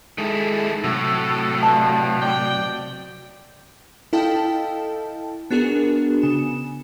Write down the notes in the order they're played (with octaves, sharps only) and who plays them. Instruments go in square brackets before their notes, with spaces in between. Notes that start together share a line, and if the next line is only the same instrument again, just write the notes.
[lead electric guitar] D#3 E4 [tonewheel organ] G#3 A4
[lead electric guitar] A2 [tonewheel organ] C3 F#3 [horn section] F#4 A4
[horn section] G2 B2 [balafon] A5
[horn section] D5 G5
[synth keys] E4 A4 D#5 F5 G5 A5
B3 D4 F#4 G#4 A#4
C#3 E7